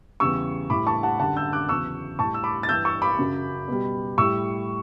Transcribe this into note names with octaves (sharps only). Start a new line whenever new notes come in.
E2 C#3 G3 C#6 E6
A2 E3 G3 B5 D6
A5 C#6
F#5 A5
F#2 D3 G3 F#5 A5
E6 G6
D6 F#6
E2 C#3 F#3 C#6 E6
A2 G3 A5 C#6
E6
B5 D6
A6
G2 E3 G3 E6 G6
C#6 E6
B5 D6
F#2 C#3 F#3
B2 G3
A2 G3 C#6 E6